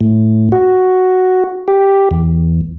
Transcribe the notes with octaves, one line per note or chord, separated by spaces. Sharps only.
A2
F#4
G4
E2